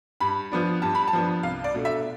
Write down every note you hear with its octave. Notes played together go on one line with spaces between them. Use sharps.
G2 B5
F3 B3 D4
G2 A5
B5
A5
F3 B3 D4
C2 F5
D5
B2 A3 D4
E5